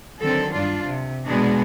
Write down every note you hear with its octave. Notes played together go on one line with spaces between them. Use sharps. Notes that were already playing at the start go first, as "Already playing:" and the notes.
D3 D#3 F#3 C4 A4
G2 D4 F4
C3
B2 G#3 B3 D4 F#4 G#4